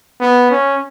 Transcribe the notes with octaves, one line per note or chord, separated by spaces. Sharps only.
B3
C#4